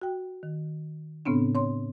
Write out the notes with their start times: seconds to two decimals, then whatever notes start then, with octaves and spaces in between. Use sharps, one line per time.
0.01 F#4 G5
0.43 D#3
1.25 A2 C#3 B3 C4 D4
1.55 C#5 C6